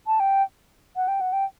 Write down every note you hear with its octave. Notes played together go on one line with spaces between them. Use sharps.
A5
G5
F#5
G5
F#5
G5